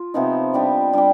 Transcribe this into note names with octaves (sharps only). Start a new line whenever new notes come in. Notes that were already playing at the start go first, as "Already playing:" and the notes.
Already playing: F4
C3 F3 B3 D#4
G3 D4 G4
G3 D4 G4